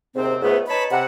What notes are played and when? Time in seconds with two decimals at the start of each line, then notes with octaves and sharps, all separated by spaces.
0.16 D#2 G#2 C3 C4
0.42 C#2 G#2 A3 B3 B4
0.67 D#4 B4 C#5 A5 B5
0.91 C3 F#5